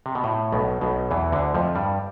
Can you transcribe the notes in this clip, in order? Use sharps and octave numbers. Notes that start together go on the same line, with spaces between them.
C3
B2
A2
B1 B2
B1 B2
E2 E3
D2 D3
F2 F3
G2 G3